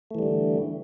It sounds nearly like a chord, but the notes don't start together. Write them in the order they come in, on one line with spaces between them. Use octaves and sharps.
A3 E3 G3 D3